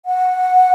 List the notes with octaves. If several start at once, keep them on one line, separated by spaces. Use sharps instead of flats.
F#5